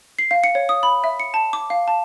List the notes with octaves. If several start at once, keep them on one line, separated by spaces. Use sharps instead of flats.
C7
F5
C#7
C#5
D#6
B5
E5
C#7
A5
D6
F5
A5